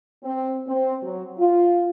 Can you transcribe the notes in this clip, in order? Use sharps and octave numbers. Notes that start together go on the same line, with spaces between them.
C4
C4
F#3
F4